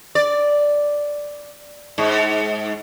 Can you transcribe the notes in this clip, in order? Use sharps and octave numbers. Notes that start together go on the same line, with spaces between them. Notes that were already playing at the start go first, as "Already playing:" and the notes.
D5
G#2